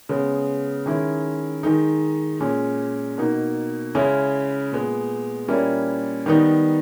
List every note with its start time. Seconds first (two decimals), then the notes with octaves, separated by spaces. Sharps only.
0.09 C#3 G#3 B3
0.86 D#3 G#3 C#4 E4
1.63 D#3 G#3 D#4
2.40 A#2 G#3 C#4
3.18 B2 A#3 D#4
3.95 C#3 G#3 C#4 E4
4.72 A#2 G#3 B3
5.48 A#2 G3 A#3 C#4 E4
6.26 D#3 G3 B3 D#4